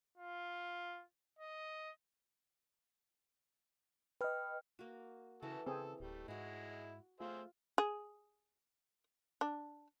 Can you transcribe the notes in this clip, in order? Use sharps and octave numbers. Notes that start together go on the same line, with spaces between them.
F4
D#5
B4 D#5 G5 F6
A#3 F#4
C#3 E3 F#4 A4 A5
C#3 C4 G#4 A4
D1 G3 A3
G#2 G#3 E4 F#4 F#5
A3 F4 G#4 C5 E5
G#4
D4